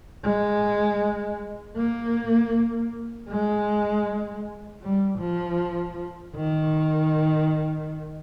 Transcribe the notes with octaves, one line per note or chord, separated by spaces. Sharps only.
G#3
A#3
G#3
G3
F3
D#3